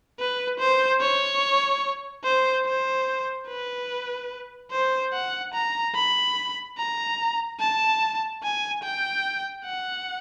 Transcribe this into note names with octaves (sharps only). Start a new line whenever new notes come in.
B4
C5
C#5
C5
C5
B4
C5
F#5
A#5
B5
A#5
A5
G#5
G5
F#5